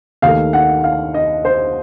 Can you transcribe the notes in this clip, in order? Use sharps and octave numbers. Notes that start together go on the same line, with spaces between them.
D#2 D#3 A3 F5
F#5
F5
D#5
C5